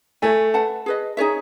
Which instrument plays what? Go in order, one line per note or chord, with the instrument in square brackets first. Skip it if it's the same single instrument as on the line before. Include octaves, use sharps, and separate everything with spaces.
[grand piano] A3 [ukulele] A4 C#5 E5 G#5
[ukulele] B4 F#5 A5
G#4 B4 D#5
D#4 G#4 C#5 E5